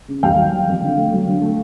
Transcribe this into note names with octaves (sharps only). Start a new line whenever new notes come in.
C#3
D#2 F5 G5
F#3
F#3
F2
D3
A3
F#3
D3
A3